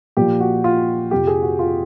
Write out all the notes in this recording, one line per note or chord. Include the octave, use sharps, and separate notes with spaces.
A#2 F3 G4
F#4
F4
F2 C3 F3 G4
G#4
F#4
F4